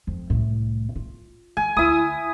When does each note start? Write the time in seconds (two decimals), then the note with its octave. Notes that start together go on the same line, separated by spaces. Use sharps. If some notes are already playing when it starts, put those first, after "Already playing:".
0.07 F2
0.30 C2 A2
0.96 F4
1.57 E3 G#5
1.77 D2 E4 D#6